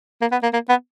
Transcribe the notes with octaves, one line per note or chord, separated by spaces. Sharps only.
A#3
B3
A#3
A#3
B3